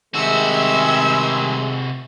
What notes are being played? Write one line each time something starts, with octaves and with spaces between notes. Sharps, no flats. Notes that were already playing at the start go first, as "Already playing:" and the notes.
C3 D#3 G3 G#3 F#4 E5 E6